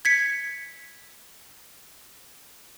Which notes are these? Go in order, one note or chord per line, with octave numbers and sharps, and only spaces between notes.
G#6 B6 C#7